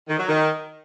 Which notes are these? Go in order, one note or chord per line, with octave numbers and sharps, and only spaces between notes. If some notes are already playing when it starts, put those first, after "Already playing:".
D#3
F#3
D#3